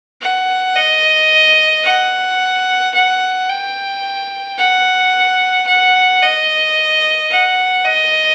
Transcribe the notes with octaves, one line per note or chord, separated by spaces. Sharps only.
F#5
D#5
F#5
F#5
G5
F#5
F#5
D#5
F#5
D#5